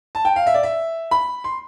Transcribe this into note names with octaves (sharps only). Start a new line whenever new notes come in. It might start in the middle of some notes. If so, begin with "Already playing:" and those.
A5
G5
F5
E5
D5
E5
B5
C6